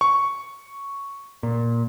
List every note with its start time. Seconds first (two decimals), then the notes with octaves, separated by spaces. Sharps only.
0.01 C#6
1.43 A#2